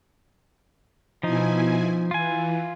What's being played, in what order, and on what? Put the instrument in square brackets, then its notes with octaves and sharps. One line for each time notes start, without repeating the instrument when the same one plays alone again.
[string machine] B2 E4 G#5 [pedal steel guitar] F3 D#4
[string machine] E3 [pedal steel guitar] F4 G#5